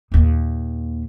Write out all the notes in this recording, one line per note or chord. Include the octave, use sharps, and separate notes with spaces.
D#2 A#2